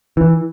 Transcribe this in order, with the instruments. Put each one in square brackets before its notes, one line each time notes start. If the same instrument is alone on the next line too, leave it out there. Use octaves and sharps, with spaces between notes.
[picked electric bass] E3